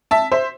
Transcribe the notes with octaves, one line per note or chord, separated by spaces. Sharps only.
E5 A5
C5 E5